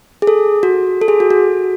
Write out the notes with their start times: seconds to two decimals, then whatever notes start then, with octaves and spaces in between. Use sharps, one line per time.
0.22 G#4
0.27 A4
0.63 F#4
1.01 A4
1.08 G#4
1.20 F#4
1.31 F#4